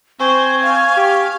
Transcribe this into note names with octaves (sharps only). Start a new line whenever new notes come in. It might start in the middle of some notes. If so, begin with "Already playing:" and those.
C4 C5 G#5 C#6
F5
G4